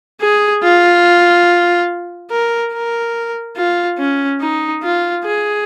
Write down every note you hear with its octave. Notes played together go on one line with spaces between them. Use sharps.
G#4
F4
A#4
A#4
F4
C#4
D#4
F4
G#4